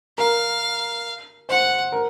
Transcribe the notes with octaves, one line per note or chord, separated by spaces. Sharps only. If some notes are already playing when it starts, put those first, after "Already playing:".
A#4 F5
C5 F#5
A#4